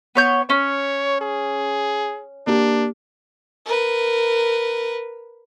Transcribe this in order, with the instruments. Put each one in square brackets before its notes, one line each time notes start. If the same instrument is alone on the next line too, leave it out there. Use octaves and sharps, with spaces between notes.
[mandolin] B3 C#5 G6
[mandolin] C#4 [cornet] C#5
[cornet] G#4
[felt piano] A#3 G4 [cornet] D4
[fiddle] A#4 B4